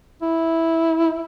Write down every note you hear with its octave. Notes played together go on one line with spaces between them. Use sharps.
E4